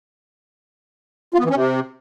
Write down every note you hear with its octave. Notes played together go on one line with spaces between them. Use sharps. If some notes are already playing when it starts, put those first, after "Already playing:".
F4
B3
E3
C#4
C3